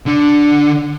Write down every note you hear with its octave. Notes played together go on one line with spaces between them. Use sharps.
D3 D4